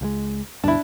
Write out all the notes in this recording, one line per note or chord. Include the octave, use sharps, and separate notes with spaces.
C#2 F3 G#3
D2 G2 B2 D4 E4 A5